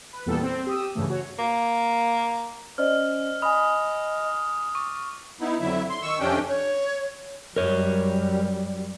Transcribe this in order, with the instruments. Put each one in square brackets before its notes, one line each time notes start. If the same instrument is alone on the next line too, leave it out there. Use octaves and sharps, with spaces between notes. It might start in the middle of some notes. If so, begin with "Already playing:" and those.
[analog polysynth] B4
E2 A#2 G3 B3 A4
C4
G4 D#6 E6
G2 C#3 E3 A3
F#4 C#5
[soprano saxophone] A#3
[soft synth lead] C#4 [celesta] C5 D5 D#5 [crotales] F6
[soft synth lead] D#5 [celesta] G#5 B5 [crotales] D#6
[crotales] C#6 [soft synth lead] D6
[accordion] B3 D#4 E4
F2 D3 F#3 E4 E5
C6
D#3 C#6 E6
F2 C3 C#4 D4 G5
[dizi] C#5
[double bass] F#2 G3 [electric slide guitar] A#4 C#5